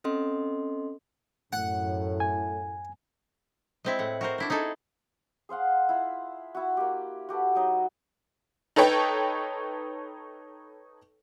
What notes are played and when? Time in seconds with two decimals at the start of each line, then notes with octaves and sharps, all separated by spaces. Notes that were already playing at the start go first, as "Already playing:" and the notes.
0.04 C4 C#4 A4 D#5 C6
1.53 F#2 A2 F#5
2.20 G#5
3.85 G#3 C4 E4
3.99 A2 F#5
4.21 F#4 A#4 C5
4.38 D4 E4 C5
4.50 D#4 E4 G#4 A4
5.49 G#4 C5 F5 F#5
5.89 E4 F4
6.55 E4 F#4
6.77 A#3 G4
7.29 F#4 G4 A4 B4
7.55 F#3 D#4 D#5
8.76 D#4 A4 B4 C#5 G5